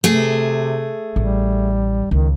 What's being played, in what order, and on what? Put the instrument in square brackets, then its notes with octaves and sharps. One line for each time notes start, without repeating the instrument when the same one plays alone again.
[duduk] C3 [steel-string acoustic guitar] A3 G#4
[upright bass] A1 [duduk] G3
[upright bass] C#2 [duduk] D#3